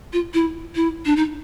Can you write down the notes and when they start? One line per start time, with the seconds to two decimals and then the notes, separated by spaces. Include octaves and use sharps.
0.13 F4
0.34 E4
0.75 E4
1.05 D4
1.16 D#4